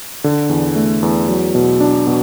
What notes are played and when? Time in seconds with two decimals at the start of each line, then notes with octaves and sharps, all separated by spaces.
0.24 D3
0.49 E2
0.76 A3
1.03 E2
1.28 F#3
1.55 B2
1.80 D4
2.07 B2